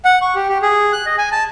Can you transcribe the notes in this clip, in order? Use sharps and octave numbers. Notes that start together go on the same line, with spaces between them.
F#5
C#6
G4
G4
G#4
F#6
D#5
G#5
A5